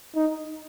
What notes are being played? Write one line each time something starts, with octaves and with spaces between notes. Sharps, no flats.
D#4